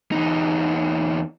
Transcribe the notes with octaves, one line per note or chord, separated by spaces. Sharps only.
E2 D#4